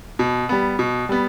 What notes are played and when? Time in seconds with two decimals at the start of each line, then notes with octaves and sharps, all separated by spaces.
0.19 B2
0.49 G3 B3
0.79 B2
1.09 G3 B3